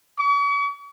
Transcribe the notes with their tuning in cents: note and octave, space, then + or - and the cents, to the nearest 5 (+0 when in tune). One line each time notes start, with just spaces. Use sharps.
C#6 +45